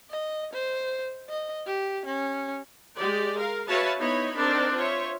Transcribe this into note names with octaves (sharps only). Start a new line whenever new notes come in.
D#5
C5
D#5
G4
C#4
G#3 G4 D5
A#4 F5
F#4 B4 C#5 E5 F5 A5
B3 D#4 E4 C#5 B5
C4 D4 D#4 A#4
F4 C5 C#5 E5